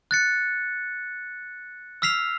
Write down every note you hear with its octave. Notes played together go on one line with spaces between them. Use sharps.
F#6 A6 C#7
E6 F6 B6 C7 F7